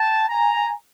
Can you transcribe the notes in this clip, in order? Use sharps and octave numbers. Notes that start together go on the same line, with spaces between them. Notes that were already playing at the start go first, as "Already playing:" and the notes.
Already playing: G5 A5
G#5 A#5